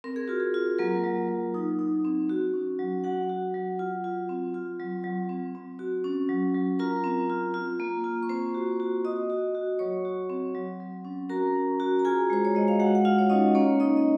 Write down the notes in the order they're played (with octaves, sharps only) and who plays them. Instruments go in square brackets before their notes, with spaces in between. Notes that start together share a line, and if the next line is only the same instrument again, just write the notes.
[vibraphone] C4 A#4
G#4
F4 F#4
G#4
F4
F#3 A#3 A#4
F#3
F#3
D#4
D#4
C4
F#4
C#4
F#3
F#3 F#4 F#5
F#4
F#3
F4
F4
C4
F4
F#3
F#3
C4
C4
F#4
C#4
F#3
F#3
F4 A#4 A#5
C4
F4
F4
A#3
F4
C#6
C4 C5 C6
F#4
F#4
F#4 D#5 D#6
F#4
F#4
F#3 C#5 C#6
F#4
C4
F#3
F#3
C#4
F#4 A#4 A#5
C#4
F#4
A#5
F4 G#4 G#5
G#3 C5
C#5
G#3 D#5
F5
G#3 F#4 F#5
F#5
F4 F5
C#5
C#4 D#4 D#5
A#3 C#4 C#5
D#4 D#5
D#5